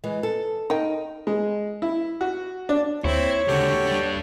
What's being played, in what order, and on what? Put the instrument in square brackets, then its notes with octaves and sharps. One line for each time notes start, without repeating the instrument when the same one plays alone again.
[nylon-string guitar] E3 G#3
A4
[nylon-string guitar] D#4 [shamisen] A#4 G5
[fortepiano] G#3
E4
F#4
D4
[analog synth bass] D#2 [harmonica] C4 [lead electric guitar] E4 [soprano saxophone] C#5
[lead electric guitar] C#2 D3 [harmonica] F#4 G4 A4
[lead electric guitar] G3 D4